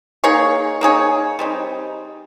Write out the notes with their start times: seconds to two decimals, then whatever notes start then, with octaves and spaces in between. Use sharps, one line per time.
0.24 A#3 D#4 G#4 C#5
0.81 A#3 D#4 G#4 C#5
1.39 G3 C4 D#4